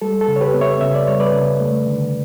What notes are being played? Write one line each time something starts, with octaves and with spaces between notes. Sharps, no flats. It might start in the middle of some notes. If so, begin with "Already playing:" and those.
G3 A4
A4
C#3
C#5
G4 B4
B3
C#5 E5
C#3 E5
D5
G3 C#5
B4 D5
C#3
A3
D3